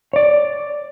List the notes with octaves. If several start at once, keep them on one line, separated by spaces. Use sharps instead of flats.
C#5 D5